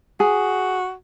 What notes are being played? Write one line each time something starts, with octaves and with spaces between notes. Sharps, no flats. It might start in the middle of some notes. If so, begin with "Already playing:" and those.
F#4 G#4